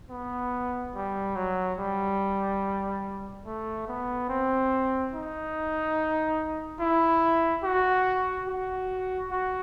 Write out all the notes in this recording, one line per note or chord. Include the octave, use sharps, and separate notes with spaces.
B3
G3
F#3
G3
A3
B3
C4
D#4
E4
F#4
F#4
F#4